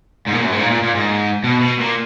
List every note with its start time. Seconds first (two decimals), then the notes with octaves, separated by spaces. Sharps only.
0.27 G#2
0.33 A#2
0.43 F#2
0.52 G#2
0.61 A#2
0.71 A#2
0.83 A#2
0.95 G#2
1.44 B2
1.61 B2
1.80 A#2